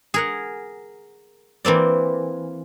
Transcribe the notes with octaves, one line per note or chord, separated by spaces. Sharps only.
G#4 A#4 F#5
E3 A#3 C4 D5